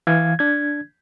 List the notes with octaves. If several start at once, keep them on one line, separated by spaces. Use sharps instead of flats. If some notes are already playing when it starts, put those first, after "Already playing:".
E3 F5 G#6
D4 G#6